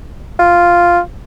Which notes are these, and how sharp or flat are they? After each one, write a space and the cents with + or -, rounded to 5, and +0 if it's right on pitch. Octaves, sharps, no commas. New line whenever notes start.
F4 +0